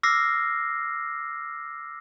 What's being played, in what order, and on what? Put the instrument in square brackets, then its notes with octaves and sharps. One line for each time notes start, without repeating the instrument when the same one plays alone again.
[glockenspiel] D6 E6 F6 A#6 C7